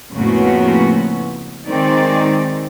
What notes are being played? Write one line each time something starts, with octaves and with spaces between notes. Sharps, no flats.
F2 A2 C#3 A#3 B3 F#4
D#3 G#3 C4 D#4 D5